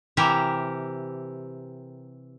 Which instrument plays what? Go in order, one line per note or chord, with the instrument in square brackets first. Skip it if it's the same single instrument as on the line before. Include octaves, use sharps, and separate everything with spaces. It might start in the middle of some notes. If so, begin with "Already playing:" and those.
[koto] C3 E3 G4 A#4